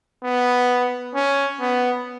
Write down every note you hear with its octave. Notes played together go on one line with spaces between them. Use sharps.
B3
C#4
B3